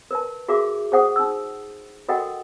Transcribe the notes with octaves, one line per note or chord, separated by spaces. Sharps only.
A#4 B4 A5
F#4 G#4 A#4 E5 D6
G#4 C5 F#5 D#6
D#4 E6
F#4 A4 A#4 D#5 F#5 G5